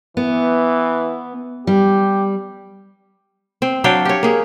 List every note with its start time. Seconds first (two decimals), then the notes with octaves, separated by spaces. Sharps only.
0.17 E3 B3
1.67 G3 G4
3.62 C4
3.84 F#3 D4 F5 G5
4.05 G4 C#5
4.23 A#3 G#4